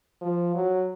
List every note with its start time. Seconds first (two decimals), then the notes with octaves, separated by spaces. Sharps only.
0.21 F3
0.55 F#3